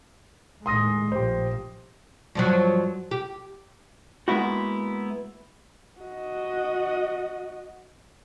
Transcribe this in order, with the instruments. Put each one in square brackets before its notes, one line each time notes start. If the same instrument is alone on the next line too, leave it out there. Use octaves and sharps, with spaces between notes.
[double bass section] D#2 A2 G#3 [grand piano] C6 D#6 A#6
[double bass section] A#1 F3 [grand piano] G4 C5
[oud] G2 F3 F#3
G4
[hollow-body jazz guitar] G#3 A#3 B3 E4 F#4
[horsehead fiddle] F#4 D#5